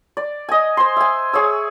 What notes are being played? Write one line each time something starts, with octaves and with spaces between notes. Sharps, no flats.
D5
D#5 G#5
C5 C6
E5 G#5
G#4 C#5 E6